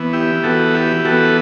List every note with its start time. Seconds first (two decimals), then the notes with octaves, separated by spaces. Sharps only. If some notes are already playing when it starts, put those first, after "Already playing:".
Already playing: E3 B3
0.13 E4 G4
0.44 E3 B3 F#4 A4
0.74 E4 G4
1.05 E3 B3 F#4 A4